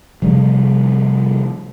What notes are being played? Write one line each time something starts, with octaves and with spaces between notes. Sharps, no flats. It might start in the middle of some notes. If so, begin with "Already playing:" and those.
C3 F3 G3 A3